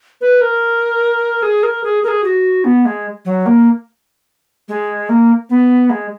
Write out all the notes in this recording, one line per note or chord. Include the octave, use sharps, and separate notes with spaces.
B4
A#4
G#4
A#4
G#4
A#4
G#4
F#4
B3
G#3
F#3
A#3
G#3
A#3
B3
G#3